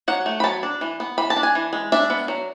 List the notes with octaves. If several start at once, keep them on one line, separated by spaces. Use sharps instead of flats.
F#3 F#5
A3
B5
F#3 A5
D4
E3
B3
E3 B5
A5
D4
G#5
E3
G#3
D4 E5
B3
F#3